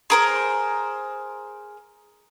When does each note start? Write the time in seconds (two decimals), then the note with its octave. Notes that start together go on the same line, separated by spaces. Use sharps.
0.10 G#4 A#4 C5